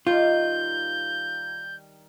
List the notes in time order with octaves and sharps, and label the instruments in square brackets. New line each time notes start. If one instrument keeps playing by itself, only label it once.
[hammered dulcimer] D#3 G3 [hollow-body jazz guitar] F4 [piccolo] G6